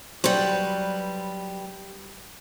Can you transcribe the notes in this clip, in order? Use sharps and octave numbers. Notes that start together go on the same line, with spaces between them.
F#3 G3 B4 C5